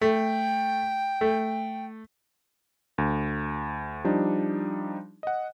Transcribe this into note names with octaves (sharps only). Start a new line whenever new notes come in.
A3 G5
A3
D2
F3 G3 D4 D#4
D#5 F#5